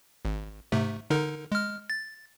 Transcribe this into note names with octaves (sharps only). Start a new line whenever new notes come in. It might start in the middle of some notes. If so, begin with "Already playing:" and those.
G#1
G#2 C3 A3
D3 D#4 A#4
G#3 F6
A6